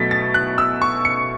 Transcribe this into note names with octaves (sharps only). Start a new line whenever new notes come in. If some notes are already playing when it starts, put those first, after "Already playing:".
Already playing: B2 F#3 A3 A6 B6
A6
F#6
E6
C#6
C#7